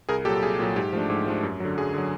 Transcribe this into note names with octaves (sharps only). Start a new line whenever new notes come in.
C2 G#4 A#4
A#2 F#3 G4 A4
C2 G#4
A#2 F#3
G#2 G4
F3 A3 D4
G#2
F3 A3 D4
F#2
D3 F#3
F#2 G#4
D3 F#3